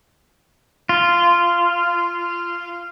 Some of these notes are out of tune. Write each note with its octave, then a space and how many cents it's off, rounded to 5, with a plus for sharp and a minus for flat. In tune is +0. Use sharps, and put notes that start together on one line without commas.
F4 -15